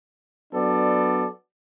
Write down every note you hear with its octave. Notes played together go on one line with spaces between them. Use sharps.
F#3 B3 D4 A4 D5